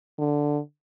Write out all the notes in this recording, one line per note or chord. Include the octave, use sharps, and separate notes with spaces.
D3